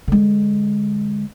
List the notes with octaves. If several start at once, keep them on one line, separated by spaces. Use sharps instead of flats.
D3 G#3